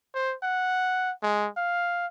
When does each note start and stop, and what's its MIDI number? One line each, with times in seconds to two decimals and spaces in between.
0.14 0.35 72
0.43 1.12 78
1.23 1.48 56
1.57 2.07 77